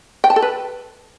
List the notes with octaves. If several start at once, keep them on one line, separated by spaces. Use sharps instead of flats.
G5
A5
A4
B4